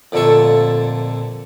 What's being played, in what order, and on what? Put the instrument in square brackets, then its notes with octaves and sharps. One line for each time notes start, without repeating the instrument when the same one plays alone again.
[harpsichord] F2 A#2 D3 A3 A4 C#6